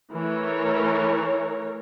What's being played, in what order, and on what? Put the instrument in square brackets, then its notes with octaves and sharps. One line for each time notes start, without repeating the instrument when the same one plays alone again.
[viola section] E3 A3 A#4 C#5